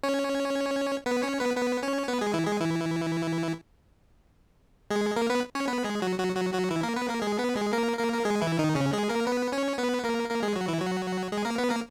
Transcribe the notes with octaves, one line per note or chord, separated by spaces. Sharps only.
C#4 C#5
B3 B4
C#4 C#5
B3 B4
B3 B4
C#4 C#5
B3 B4
G#3 G#4
E3 E4
G#3 G#4
E3 E4
G#3 G#4
A#3 A#4
B3 B4
C#4 C#5
B3 B4
G#3 G#4
F#3 F#4
F#3 F#4
F#3 F#4
F#3 F#4
E3 E4
A#3 A#4
B3 B4
A#3 A#4
G#3 G#4
B3 B4
G#3 G#4
A#3 A#4
A#3 A#4
A#4
G#3 G#4
E3 E4
D#3 D#4
C#3 C#4
G#3 G#4
A#3 A#4
B3 B4
C#4 C#5
B3 B4
A#3 A#4
A#3 A#4
G#3 G#4
F#3 F#4
E3 E4
F#3 F#4
G#3 G#4
A#3 A#4
B3 B4
A#3 A#4